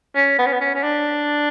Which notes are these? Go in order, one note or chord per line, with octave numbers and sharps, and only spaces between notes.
C#4
B3
C#4
B3
C#4
C#4
D4